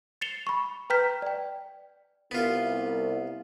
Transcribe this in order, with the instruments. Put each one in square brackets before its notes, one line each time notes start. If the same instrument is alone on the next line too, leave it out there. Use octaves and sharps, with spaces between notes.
[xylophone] A6 C7 C#7 E7 F7 G7
B5 C#6
B4 G5 A#5 F6 G6 B6
D5 G5
[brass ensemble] C2 [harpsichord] B3 F4